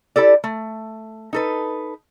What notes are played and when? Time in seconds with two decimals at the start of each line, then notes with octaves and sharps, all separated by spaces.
0.16 E4 G4 A4 D5
0.44 A3
1.33 D#4 A4 B4